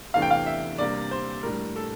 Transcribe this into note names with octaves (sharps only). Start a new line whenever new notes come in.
E2 C3 E3 A3 D4 F5
G5
F5
E5
C3 G3 A#3 D4 D5
C5
A2 G3 D4 A#4
A4